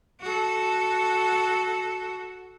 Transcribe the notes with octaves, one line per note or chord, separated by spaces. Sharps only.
F#4 A4